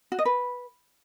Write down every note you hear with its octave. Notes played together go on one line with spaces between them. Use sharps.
F#4
D#5
B4